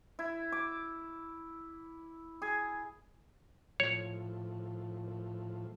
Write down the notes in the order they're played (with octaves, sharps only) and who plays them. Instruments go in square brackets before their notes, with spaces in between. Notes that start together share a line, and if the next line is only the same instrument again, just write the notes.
[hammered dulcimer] E4
D6
G#4
[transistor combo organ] A2 F3 [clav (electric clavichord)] C#5